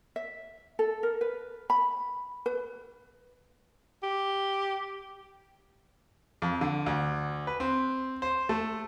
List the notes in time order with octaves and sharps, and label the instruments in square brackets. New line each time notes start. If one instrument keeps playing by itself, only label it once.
[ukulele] E5
A4
A#4
B4
B5
B4
[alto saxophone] G4
[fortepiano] F2
D3
D2
B4
C4
C5
A3